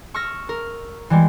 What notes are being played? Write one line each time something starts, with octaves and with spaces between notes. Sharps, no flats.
C#6 E6 F6 A#6
A#4
E3 G3 G#3